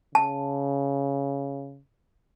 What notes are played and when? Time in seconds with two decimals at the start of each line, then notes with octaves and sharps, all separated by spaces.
0.15 C#3 A5